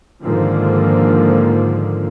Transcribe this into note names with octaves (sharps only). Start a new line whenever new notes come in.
G#2 D3 D#3 F3 A#3